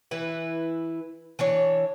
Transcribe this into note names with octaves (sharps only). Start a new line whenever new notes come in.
E3 E4 B4
E3 D4 C#5